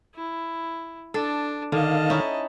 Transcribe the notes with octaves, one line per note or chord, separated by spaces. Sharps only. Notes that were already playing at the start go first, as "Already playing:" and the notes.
E4
D4 A4
D3 D#3 D#5 F5 A5
C#4 D#4 E4